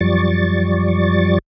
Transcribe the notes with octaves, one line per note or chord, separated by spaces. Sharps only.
F#2 F3 G3 D5 C#6 A6